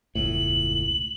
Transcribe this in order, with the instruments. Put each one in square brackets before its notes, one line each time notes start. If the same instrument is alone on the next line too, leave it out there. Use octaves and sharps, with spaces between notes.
[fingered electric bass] E1 C#2 A2 [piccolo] F#7